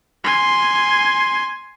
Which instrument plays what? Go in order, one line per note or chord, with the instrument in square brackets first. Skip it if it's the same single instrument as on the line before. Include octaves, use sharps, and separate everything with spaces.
[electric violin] G#5 C6